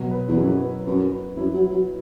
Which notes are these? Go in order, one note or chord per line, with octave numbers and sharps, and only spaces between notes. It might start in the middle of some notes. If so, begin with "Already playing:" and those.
Already playing: B2 F#3
B4
E2
F#2 E4
B4
F#2 B4
B4
F#2 E4
F#3
E4
F#3